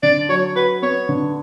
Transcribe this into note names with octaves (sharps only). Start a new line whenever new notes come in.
D3 D5
F#3 C#5
F#4 B4
B3 C#5
D3